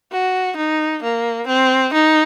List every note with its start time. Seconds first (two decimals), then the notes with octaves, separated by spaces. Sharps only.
0.12 F#4
0.57 D#4
1.03 A#3
1.48 C4
1.93 D#4